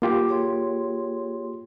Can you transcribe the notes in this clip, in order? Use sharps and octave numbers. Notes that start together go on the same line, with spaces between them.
A#3 F4 G4 D6
G#4 C#5 C6